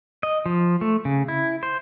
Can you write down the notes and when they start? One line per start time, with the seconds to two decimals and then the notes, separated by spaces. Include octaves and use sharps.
0.23 D#5
0.46 F3
0.81 A3
1.05 C#3
1.28 E4
1.63 C5